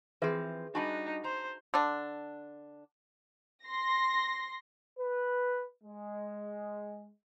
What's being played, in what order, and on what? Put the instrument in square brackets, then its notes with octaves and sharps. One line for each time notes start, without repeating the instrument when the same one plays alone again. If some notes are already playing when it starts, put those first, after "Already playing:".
[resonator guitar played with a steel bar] E3 F3 C4 [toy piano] G#4 B4 E5
[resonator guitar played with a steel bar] G3 D4 F#4 [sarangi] D#4 [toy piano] G#5 A5 B5
[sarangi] C5 [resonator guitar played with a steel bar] A#5
[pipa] D3 D4
[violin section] C6 A#6
[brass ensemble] B4
G#3